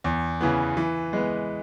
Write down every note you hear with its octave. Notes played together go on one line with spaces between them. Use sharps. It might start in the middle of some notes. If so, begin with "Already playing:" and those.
E2
C#3 E3 B3
E3
G#3 B3